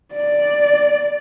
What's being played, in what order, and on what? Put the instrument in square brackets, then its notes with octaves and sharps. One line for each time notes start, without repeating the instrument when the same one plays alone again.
[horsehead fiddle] D5